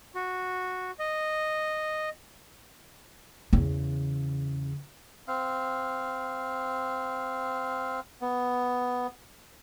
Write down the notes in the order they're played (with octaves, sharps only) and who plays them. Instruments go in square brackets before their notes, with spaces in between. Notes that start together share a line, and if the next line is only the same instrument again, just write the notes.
[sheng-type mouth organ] F#4
D#5
[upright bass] E2 C#3
[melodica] C4 F5
[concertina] B3